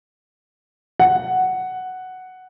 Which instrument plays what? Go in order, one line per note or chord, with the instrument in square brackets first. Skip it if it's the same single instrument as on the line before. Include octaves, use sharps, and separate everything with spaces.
[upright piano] F#5